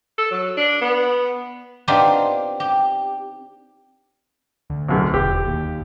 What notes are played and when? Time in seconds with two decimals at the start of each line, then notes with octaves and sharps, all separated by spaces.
0.18 A4
0.31 F#3
0.57 D4
0.81 B3
1.88 B3 C4 D4 D#4 F4 G4
2.60 G4
4.70 D2
4.88 B1 F#2 C3
5.14 E1 G4
5.47 D#2